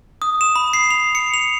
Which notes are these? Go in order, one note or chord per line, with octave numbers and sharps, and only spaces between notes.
D#6
E7
B5
C7
F7
C#7
F7